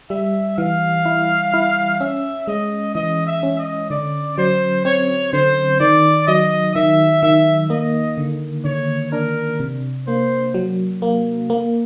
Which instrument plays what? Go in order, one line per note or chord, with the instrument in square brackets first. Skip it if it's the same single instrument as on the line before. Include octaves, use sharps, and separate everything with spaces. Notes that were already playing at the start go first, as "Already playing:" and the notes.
[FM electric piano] G3 [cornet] E5
[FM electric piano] E3 [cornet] F5
[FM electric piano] E4
E4
[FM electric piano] C#4 [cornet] E5
[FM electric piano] G#3 [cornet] D#5
[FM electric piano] E3 [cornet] D#5
[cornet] E5
[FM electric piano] C#4
[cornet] D#5
[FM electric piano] D3 [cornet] D5
[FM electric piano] F#3 [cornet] C5
[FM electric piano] C4 [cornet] C#5
[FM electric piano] D3 [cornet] C5
[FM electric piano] D#3 [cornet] D5
[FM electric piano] F#3 [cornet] D#5
[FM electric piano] D#3 [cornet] E5
[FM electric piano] D#3 [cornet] E5
[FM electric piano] A#3 [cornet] D#5
[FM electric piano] D3
[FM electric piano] D3 [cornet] C#5
[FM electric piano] D4 [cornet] A#4
[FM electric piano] C3
[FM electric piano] A#3 [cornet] C5
[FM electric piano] F#3
A#3
A#3